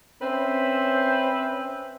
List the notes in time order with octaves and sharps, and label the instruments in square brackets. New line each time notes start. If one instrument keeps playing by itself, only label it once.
[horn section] C4 C#4 B4 C5 E5